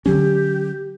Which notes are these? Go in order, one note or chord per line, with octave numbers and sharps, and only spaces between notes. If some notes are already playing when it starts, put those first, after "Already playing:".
D3 F#3 C#4 G4